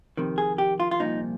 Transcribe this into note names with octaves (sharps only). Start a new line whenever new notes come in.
F2 C3 D#3
G#4
G4
F4
F4
C2 A#2 F3 D#4